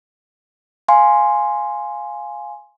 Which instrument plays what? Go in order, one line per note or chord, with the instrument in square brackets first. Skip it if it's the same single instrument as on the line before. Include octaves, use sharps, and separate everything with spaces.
[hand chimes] F5 G#5 C6